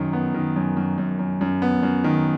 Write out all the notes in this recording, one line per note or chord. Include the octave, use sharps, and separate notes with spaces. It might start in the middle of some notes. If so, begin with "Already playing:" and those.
Already playing: F#2 D#3
B3
D#3
F#2
F#2
F#2
F#2
F#2
B3
F#2
D#3